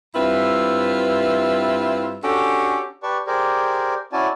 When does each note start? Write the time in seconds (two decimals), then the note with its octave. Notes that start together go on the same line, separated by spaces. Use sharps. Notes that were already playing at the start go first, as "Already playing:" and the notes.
0.15 G2 C4 E4 F4 B4 E5
2.24 C#4 D4 F#4 G4 A4
3.03 G4 B4 D5 A5 C#6
3.27 G4 G#4 A#4 C5 D5
4.13 C#4 E4 F#4 D5 G#5 A5